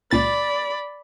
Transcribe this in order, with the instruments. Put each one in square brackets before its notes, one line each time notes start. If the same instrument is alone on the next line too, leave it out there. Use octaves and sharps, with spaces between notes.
[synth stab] C#2 A#2 A6 [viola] D5 B5